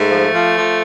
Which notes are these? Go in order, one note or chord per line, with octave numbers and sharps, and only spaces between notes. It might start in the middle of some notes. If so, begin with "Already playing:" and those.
Already playing: G#2 A3
F3
F3
F3